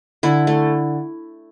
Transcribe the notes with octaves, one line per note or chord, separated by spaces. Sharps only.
D3 E4
A3